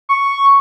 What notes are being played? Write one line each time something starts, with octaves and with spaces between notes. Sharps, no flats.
C#6